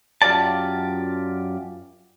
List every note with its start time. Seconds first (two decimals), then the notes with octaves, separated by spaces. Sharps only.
0.22 F#2 F4 G4 D5 A5